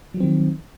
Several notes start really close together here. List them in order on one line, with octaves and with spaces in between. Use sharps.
F#3 F3 C4 D#3